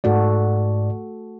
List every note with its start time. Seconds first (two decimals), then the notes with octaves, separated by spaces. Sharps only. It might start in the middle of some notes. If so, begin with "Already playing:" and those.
0.04 G#2 A3 F#4 A4 D5